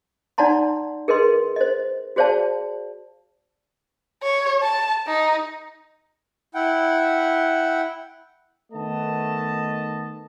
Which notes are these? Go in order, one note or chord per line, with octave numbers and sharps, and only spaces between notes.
D#4 D5 F#5 A5 A#5 C6
G#4 A#4 B4 D#5 C6
C5 D#5
F#4 G#4 C5 D5 F5 A5
C#5
A5
D#4
E4 F#5 G5
D#3 A3 B3 D#5 A5